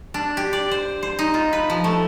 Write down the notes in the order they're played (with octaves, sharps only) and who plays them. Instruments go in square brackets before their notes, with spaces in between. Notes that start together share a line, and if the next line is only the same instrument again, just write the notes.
[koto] D4
G4
D5
C5
C5
D#4
F4
B4
F3
A3